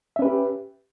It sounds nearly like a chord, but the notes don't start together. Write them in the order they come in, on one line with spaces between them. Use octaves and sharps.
E5 C#4 B4 G4